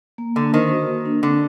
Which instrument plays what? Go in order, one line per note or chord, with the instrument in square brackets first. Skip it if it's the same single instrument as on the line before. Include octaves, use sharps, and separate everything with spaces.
[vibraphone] A#3
[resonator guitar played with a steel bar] D3 [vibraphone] D4
[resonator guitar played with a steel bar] D#3 [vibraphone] C5
[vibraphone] F#4
A#3
D4
[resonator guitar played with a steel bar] D3 [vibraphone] C4